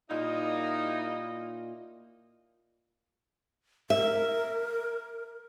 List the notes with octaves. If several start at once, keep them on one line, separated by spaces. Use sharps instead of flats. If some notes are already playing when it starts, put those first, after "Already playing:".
A#2 G3 A#3 D#4 E4 D#5
A#4 E5